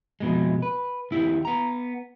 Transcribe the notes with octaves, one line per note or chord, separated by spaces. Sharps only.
F2 B2 G#3
B4
D#2 E4 G4
B3 A#5